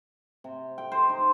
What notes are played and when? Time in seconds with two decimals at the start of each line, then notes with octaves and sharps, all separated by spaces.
0.44 C3
0.78 G5
0.92 C5
1.09 D#4